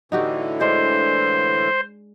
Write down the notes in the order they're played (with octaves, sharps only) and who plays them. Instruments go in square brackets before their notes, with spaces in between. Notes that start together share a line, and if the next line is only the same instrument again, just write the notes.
[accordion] A2 D3 E3 [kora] D#4 F#4 G4
[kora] G#3 D4 [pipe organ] C5